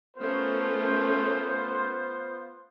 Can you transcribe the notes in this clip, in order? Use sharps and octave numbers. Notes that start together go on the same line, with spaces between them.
A3 B3 C#4 F4 A#4 C5